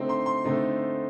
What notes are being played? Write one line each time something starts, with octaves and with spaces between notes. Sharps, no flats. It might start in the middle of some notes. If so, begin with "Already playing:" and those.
Already playing: D3 A3 C4 D#4
C6
C6
D3 A3 C4 D#4